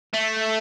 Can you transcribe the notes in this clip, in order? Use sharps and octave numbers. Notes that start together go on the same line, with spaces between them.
A3